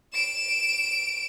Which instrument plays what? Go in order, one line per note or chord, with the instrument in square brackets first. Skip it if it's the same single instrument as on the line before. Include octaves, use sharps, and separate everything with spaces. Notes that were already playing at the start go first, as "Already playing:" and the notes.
[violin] D7 E7